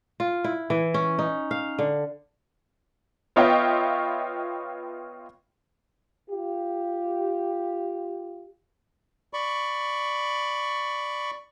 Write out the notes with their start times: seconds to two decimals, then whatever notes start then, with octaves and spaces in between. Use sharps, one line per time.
0.20 F4
0.44 E4
0.70 E3
0.94 C#4
1.19 D#4
1.51 F5
1.79 D3
3.36 B3 F4 C#5 D#5 E5 G5
6.30 F4 G4
9.33 D5 B5 C#6